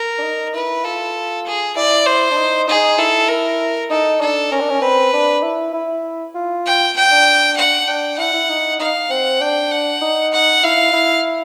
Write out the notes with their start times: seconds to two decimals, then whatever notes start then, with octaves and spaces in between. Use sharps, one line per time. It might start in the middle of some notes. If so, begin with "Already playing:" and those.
Already playing: A#4
0.18 D4
0.23 D#4
0.54 E4 B4
0.84 F4 A4
1.46 G#4
1.76 E4 D5
2.06 C5
2.31 D4
2.37 D#4
2.68 D#4 G#4
2.98 E4 A4
3.29 A#4
3.90 D#4 A4
4.21 D4 A4
4.51 C#4 A#4
4.60 D4
4.70 C#4
4.81 C4 B4
5.13 D4
5.43 E4
5.73 E4
6.34 F4
6.66 G5
6.96 G5
7.11 D4
7.57 F#5
7.88 D4 G5
8.18 E4 F#5
8.33 E4
8.49 D#4
8.79 D#4 F5
9.10 C4 F#5
9.41 D4 G5
9.71 F#5
10.02 D#4
10.32 F#5
10.63 E4 F5
10.93 E4